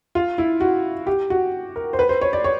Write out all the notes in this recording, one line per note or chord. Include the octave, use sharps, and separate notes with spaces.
F4
E4
F#4
G4
F#4
A#4
C5
B4
C5
C#5
D5
C#5